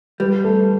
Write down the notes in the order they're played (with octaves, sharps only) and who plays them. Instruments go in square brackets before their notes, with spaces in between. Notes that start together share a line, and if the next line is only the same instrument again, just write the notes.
[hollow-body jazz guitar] G3 [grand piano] B4
[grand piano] A3